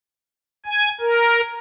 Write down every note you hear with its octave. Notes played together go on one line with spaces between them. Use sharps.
G#5
A#4